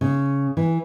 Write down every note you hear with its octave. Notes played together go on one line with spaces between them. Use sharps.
C#3
E3